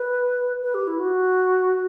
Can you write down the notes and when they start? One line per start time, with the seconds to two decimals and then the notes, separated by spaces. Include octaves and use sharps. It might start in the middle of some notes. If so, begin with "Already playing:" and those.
Already playing: B4
0.62 B4
0.74 G4
0.87 E4
0.99 F#4